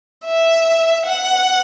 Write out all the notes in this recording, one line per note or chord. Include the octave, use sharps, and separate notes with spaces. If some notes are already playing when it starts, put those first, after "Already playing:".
E5
F#5